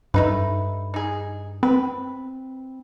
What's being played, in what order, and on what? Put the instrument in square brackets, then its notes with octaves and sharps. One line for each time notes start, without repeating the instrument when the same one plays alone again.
[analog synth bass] G2 [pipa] A3 D#4 B4
[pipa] D#4 G#4
[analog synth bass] C4 [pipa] B4